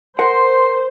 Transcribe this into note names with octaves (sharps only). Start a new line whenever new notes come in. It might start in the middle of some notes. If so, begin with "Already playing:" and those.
A#4 C5 F#5 C6